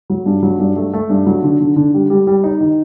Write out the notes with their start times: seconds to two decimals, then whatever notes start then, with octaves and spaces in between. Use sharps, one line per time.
0.10 F#3
0.26 G2
0.43 F#3
0.59 G2
0.76 A3
0.93 A3
1.10 G2
1.26 F#3
1.43 D3
1.60 D3
1.76 D3
1.94 G3
2.10 G3
2.27 G3
2.44 D#4
2.60 D#3